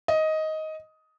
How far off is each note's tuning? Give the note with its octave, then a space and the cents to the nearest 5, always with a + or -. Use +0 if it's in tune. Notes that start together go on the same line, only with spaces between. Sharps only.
D#5 +10